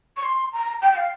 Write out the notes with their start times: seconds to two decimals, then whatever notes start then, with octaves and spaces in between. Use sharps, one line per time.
0.16 C#6
0.23 C6
0.52 A#5
0.81 G5
0.92 G5
0.96 F5